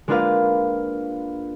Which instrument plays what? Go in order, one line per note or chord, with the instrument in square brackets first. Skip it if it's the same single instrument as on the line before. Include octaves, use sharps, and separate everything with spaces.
[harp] G#3 A#3 D4 F4 B4 F5